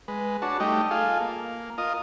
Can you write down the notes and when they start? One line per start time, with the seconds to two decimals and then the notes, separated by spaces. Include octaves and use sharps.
0.08 G#3 B4
0.42 D4 F#4 C#5 A5
0.60 G3 A3 D#4 D#5 G5
0.91 F4 G#4 A4 F5
1.21 A#3
1.78 F4 A#4 D#5 D#6